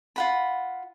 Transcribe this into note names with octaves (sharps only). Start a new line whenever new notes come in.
F4 F#5 B5